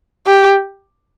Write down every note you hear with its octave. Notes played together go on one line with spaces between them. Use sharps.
G4